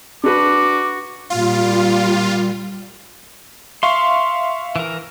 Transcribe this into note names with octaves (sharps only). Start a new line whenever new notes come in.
D4 F#4 B4 D6
A#2 G3 F4
E5 F5 C6 C#6
E3 A#4